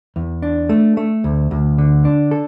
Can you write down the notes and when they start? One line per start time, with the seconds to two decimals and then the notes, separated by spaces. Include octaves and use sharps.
0.16 E2
0.42 D4
0.69 A3
0.97 A3
1.24 D2
1.51 D2
1.78 D3
2.05 D4
2.31 A4